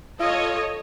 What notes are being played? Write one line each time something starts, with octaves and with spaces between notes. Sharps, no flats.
F4 A4 C#5 D#5